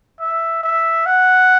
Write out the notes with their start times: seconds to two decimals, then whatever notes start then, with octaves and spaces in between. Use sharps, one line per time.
0.20 E5
0.63 E5
1.06 F#5